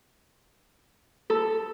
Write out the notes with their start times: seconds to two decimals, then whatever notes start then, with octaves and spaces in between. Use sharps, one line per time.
1.30 A4